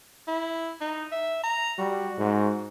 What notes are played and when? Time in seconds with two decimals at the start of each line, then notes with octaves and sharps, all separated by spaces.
0.27 E4
0.81 D#4
1.11 E5
1.43 A#5
1.78 G3 F#4
2.18 G#2